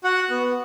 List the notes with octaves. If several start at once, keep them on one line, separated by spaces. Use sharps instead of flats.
F#4 F#5
B3